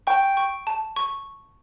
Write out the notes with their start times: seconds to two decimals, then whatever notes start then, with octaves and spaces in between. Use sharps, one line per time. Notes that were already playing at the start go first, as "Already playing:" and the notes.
0.07 G5 C#6
0.37 C#6
0.67 A5
0.96 C#6